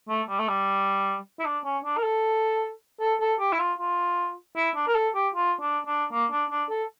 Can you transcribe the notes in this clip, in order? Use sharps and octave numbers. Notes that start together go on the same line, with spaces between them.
A3
G3
A3
G3
E4
D4
C#4
D4
A#4
A4
A4
A4
G4
E4
F4
F4
E4
D4
A#4
A4
G4
F4
D4
D4
A#3
D4
D4
A4